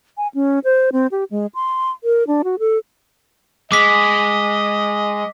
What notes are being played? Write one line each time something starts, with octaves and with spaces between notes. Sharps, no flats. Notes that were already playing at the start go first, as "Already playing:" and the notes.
G#5
C#4
C5
C4
G4
G#3
C6
A#4
D4
F#4
A4
G#3 D#5 D6 B6